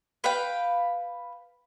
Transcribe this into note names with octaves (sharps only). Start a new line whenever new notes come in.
B4 F5 G5